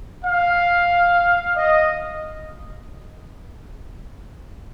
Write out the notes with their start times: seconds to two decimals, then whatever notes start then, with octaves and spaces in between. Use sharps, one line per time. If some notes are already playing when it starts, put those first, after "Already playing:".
0.25 F5
1.56 D#5